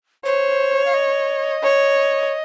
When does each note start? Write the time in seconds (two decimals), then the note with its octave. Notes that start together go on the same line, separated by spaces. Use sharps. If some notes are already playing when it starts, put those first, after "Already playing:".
0.25 C5 C#5
0.86 F5
0.94 D#5
1.63 C#5